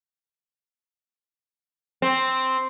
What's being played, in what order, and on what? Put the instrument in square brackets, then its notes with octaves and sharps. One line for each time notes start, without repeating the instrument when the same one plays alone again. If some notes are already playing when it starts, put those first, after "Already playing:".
[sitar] C4